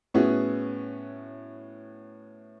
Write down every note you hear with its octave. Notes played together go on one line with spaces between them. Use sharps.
A2 B3 C#4 E4 F#4 G#4